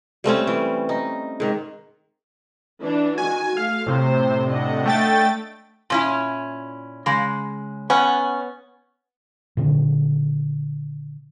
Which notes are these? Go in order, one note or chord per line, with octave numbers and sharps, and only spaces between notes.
G3 A3 C4 C#4
E3
D#4
G#2 D#3
E3 D4
D#3 F#4 G#5
A3 F5
A2 C3 C5
D4 D#5 F#5
A3 G5 A6
A#2 C#4 E4
C#3 G#3
B3 C#4 F#5
A#2 D3 D#3